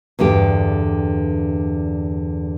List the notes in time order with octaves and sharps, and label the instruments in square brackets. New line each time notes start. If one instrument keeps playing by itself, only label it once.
[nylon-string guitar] E2 G2 D3 G4